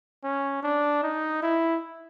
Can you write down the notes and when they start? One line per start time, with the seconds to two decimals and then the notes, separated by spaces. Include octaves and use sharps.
0.24 C#4
0.63 D4
1.03 D#4
1.42 E4